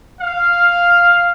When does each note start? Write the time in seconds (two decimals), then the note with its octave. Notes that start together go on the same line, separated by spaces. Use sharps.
0.21 F5